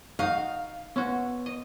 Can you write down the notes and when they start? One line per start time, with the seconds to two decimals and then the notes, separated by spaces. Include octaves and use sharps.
0.19 D#4 F#4 D#5 F5
0.96 B3 C#4 F#4
1.46 D#5